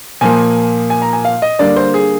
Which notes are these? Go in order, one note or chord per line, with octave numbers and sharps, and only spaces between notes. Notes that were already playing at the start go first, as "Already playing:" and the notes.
A#2 F3 A#3 G#5
G#5
A#5
G#5
F5
D#5
D3 G3 A#3 D5
C5
G#4